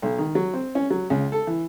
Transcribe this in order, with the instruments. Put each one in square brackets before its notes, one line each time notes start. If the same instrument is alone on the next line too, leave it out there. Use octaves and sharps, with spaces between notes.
[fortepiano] B1
D#3
F#3
C4
C#4
F#3
C#2
A4
E3